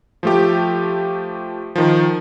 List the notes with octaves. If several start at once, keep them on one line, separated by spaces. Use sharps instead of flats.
F3 A3 G4
D#3 F3